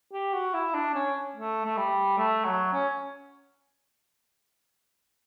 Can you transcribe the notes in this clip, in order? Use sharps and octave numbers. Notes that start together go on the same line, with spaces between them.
G4
F#4
E4
D4
C#4
A3
A3
G3
A3
F#3
C#4